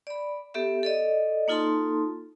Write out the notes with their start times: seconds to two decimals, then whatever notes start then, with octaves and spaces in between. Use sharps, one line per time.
0.07 D5 B5
0.54 B3 G4 A4 E5
0.83 A4 D5 D#5
1.48 A#3 D#4 F4 A4 A5 C6